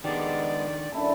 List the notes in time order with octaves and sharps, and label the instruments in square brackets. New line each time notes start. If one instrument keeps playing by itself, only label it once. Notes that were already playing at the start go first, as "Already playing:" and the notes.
[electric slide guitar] D#3 D4 [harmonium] G#3 B3 [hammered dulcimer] G4 [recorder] D5
[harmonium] F#2 [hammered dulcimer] D3 E4 A4